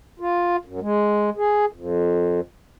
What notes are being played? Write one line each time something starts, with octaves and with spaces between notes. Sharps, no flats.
F4
F#2
G#3
G#4
F2